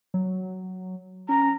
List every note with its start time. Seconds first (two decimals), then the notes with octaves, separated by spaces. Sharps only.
0.14 F#3
1.29 C#4 A#5